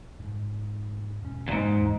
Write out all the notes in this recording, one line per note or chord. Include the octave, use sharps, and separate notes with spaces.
G#2
E1 C#4
E2 G#2
D#2 E3 F3